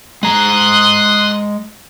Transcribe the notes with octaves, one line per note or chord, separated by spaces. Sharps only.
G#3 A#5 C6 D#6 F#6